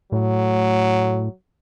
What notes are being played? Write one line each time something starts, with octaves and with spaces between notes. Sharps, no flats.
A2 F#3